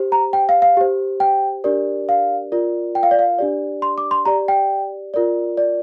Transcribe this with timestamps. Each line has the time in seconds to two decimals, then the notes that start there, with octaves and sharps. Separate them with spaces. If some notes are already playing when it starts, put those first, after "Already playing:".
Already playing: G4 C5
0.12 A#5
0.33 G5
0.49 F5
0.62 F5
0.77 G4 C5
1.20 G5
1.64 D4 G4 A#4 D5
2.09 F5
2.52 F4 A#4 D5
2.95 G5
3.03 F5
3.11 D5
3.19 F5
3.38 D4 G4 D5
3.82 C6
3.98 D6
4.11 C6
4.25 G4 D5 A#5
4.48 G5
5.14 F4 A#4 D5
5.57 D5